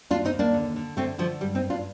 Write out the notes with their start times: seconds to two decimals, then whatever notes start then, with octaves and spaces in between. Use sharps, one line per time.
0.10 D#2 D4 F4
0.25 C4 D#4
0.33 D#2
0.39 A#3 D4
0.54 D3
0.76 D3
0.97 D3 A3 C4
1.18 D3 F3 A3
1.40 G2 G3
1.55 C4 D#4
1.63 G2
1.70 D4 F4